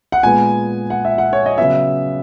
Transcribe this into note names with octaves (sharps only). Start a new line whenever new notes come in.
F#5
A#2 G#3 B3 G#5
F#5
E5
F#5
C#5
D#5
C#3 F#3 B3 E5